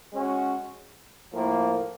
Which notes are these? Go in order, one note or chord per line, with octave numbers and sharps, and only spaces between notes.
G#3 C#4 F#4
A2 F3 A#3